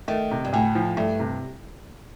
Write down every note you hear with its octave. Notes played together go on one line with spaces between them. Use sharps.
D#3 A3
C3
G2
D2 A2
F3
G2 A3
C3